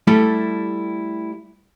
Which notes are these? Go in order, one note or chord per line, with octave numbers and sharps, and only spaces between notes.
G3 A3 E4 G4 A4